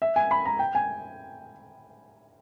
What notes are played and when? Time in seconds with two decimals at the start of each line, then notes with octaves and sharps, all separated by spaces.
0.02 E5
0.16 G#5
0.31 B5
0.45 A#5
0.59 G5
0.75 G#5